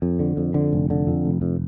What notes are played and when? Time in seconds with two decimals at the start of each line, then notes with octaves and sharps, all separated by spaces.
0.02 F2
0.19 D3
0.37 F2
0.54 D3
0.73 F1
0.90 D3
1.07 F2
1.25 F1
1.42 F2